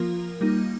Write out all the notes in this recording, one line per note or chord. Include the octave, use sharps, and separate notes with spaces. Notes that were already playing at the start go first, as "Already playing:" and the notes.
Already playing: F3 A#3 F4 A#4
G3 A#3 D#4